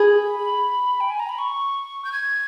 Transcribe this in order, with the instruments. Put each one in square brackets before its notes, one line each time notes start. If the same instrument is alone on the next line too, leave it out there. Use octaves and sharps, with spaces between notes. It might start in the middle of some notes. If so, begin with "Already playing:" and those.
Already playing: [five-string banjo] G#4 [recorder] B5
[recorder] G5
G#5
A#5
B5
C#6
G6
G#6